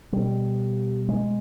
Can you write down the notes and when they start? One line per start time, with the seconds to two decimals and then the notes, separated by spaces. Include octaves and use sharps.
0.12 B2 G3
1.08 G#3